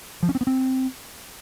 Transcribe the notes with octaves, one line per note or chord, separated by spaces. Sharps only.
F3
C#4
C4
B3
C4